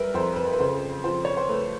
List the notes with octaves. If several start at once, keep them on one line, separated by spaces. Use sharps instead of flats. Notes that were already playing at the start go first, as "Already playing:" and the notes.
Already playing: G3 A#4 B4 E5
F2 C5
B4
B4
C#3 C5
F3 C5
C#5
C5
A3 B4